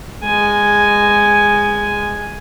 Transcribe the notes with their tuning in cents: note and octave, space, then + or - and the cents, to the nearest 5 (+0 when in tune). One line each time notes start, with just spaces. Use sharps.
G#3 -15 G#5 +0